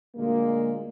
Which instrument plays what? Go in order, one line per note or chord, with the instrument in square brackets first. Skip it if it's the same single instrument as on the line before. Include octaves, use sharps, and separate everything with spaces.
[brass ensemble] D2 A#2 G#3 A#3